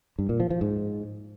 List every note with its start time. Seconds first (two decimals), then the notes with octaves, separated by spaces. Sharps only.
0.19 G2
0.29 A#2
0.40 F3
0.50 F3
0.61 G#2